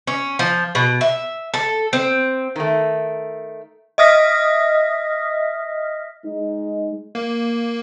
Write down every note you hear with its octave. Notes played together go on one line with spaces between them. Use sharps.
C#4
F3
B2
E5
A4
C4
D#3 A3
D#5 E5 D#6 F6 A#6 B6
G#3 D#4
A#3